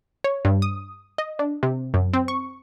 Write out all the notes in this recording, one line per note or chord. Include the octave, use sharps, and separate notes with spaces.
C#5
G2
D#6
D#5
D4
C3
F#2
C4
C#6